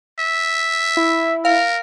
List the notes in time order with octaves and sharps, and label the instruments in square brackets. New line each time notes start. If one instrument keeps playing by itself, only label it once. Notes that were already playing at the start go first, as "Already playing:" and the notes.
[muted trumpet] E5
[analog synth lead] E4
[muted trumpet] A#4 [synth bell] F5